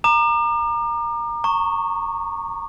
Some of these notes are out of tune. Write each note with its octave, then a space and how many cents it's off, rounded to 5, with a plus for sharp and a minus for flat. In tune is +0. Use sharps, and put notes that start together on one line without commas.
A#5 +0 D6 +40
A#5 -30 C#6 +0